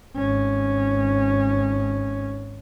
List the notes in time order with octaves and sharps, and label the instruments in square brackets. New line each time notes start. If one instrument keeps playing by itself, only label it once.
[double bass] G#1 C#4